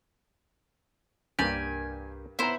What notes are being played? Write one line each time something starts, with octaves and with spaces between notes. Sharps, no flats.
C2 G2 A#3 D4 G4 A#4 D5 G#5
B3 E4 C5 A#5